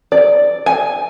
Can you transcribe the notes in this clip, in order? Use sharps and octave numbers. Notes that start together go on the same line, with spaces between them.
D5
G#5